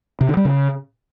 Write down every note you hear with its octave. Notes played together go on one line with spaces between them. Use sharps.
C3
D3
G3
C#3